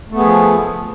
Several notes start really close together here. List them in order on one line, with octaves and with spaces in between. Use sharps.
A3 B3 G#4 F3